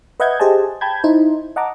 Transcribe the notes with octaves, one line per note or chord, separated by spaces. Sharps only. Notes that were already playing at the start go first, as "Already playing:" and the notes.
B4 D#5 E5 F#5 G6 G#6
G4 G#4 C5 D#5 G#5 A5
G5 A5 B5 G6 G#6
D#4 E4 C5
D#5 F#5 A5 A#5 D6